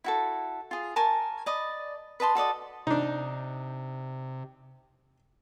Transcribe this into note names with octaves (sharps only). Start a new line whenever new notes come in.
E4 F#4 A4
F4 G#4
A#4 G#5 A5 C#6
D5 D#5 B5
B4 D#5 A5 C6
F#4 A4 D5 D#5
C3 D4 D#4